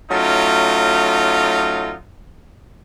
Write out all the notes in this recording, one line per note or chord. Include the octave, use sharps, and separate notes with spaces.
F#3 A3 C#4 D#4 F4